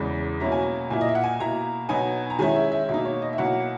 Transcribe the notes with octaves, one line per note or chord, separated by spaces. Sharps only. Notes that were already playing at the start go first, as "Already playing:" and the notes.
Already playing: E2 C#3 E3 G#3
B2 F#3 A#3 C#4 E4 A#5
G#5
A#5
A#2 A#3 E4 G#5
D#5
E5
F#5
G#5
B2 A#3 E4 A#5
B2 F#3 B3 D#4 G#5
A#5
D#3 G#3 C#4 E4 G#5
E5
E5
B2 A#3 D#4 E5
C#5
D#5
E5
B2 F#3 A#3 E4 F#5